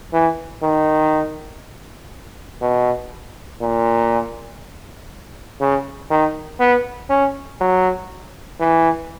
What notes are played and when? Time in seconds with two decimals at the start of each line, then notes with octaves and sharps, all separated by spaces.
0.13 E3
0.62 D#3
2.62 B2
3.61 A#2
5.60 C#3
6.10 D#3
6.60 B3
7.10 C#4
7.60 F#3
8.60 E3